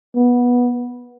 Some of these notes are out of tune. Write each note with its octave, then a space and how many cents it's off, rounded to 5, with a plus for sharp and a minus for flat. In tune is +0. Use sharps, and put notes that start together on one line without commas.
B3 -15